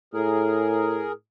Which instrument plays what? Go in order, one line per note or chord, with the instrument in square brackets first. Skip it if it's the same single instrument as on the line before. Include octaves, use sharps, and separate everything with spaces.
[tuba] A2 [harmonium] G#4 A#4